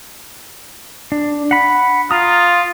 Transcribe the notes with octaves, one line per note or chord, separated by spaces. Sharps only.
D4
F#5 B5
F4 A#5 D#6